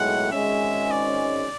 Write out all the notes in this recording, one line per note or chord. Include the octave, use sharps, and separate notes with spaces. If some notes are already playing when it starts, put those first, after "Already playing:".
Already playing: B1 A2 G#3 F#5
G#1 G#2 G#3 C#4 E5
D5